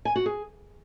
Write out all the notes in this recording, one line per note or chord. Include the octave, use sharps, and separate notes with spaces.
G#5
F#4
G#4